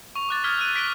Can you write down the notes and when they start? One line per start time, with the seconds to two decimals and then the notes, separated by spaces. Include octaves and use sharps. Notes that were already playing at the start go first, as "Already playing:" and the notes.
0.15 C#6 F7
0.29 D6 F#6 A6
0.44 D#6 F6 G#6 A6 B6 G7
0.57 E6 F#6 D#7
0.74 F#6 B6 D7 G7